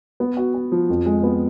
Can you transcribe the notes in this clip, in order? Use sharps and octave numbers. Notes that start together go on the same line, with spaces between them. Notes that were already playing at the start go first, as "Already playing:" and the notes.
B3
F#4
F#4
F3
F2
G#3
B3